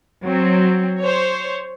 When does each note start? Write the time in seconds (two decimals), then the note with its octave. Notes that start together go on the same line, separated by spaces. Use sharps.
0.23 F#3 C4
1.01 C5 C#5